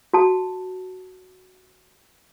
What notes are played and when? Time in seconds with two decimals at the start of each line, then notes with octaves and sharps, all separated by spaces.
0.13 F#4 A5